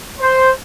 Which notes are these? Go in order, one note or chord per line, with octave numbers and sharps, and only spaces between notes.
C5